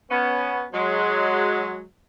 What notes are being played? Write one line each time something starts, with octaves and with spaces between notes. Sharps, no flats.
B3 C#4
F#3 G#3